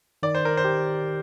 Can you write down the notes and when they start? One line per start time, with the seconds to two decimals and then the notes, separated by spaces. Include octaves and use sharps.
0.23 D#3 D5
0.35 C5
0.45 A#4
0.57 C5
0.65 G4